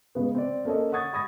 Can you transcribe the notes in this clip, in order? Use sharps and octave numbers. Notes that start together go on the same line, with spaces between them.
G#2 C#3 B3
C4 D5
A#3 C#4 A4 C#5 D#5
F#5 C#6 D#6 G#6 A6
B5 C#6 D#6 G#6 A#6